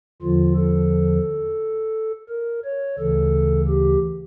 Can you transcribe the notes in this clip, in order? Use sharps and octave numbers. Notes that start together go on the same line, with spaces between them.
E2 D3 F3 F4
A4
A#4
C#5
D2 C#3 E3 A4
G4